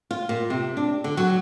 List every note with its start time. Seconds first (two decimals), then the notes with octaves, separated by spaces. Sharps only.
0.11 F4
0.29 A#2
0.50 C3
0.77 D4
1.04 D3
1.17 F#3